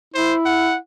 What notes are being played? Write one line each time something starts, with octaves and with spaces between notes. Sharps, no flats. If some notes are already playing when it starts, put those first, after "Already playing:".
E4 C5
F#5